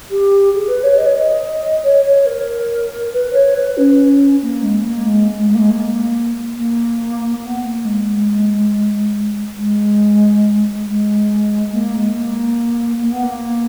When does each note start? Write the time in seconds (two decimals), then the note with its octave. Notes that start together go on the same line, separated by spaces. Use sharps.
0.10 G4
0.54 G#4
0.67 B4
0.83 C#5
0.97 D#5
1.05 C#5
1.15 D#5
1.82 C#5
2.04 C#5
2.25 A#4
3.12 B4
3.32 C#5
3.54 B4
3.77 C#4
4.41 A#3
4.62 G#3
4.83 A#3
5.05 G#3
5.37 G#3
5.48 G#3
5.54 A#3
5.59 G#3
5.70 A#3
6.55 A#3
7.42 B3
7.63 A#3
7.84 G#3
9.56 G#3
10.86 G#3
11.71 A#3
11.94 G#3
12.14 A#3
13.01 A#3
13.11 B3
13.22 A#3